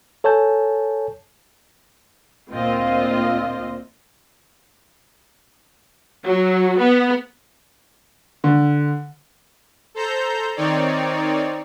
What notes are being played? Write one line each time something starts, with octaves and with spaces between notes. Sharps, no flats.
A4 C#5 G#5 A5 G6
D2 A#2 C4 F4 D#5
F#3
B3
D3
A4 C5 A#5 G6
D#3 C4 D#4 C#5 D5